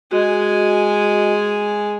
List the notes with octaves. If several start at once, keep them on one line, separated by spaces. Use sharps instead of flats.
G#3 F#4 D#5 G#5